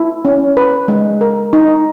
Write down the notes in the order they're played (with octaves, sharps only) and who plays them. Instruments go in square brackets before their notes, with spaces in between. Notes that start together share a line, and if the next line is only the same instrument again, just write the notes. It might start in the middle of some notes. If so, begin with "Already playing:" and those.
Already playing: [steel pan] E4
C#4
B4
G#3
A#4
D#4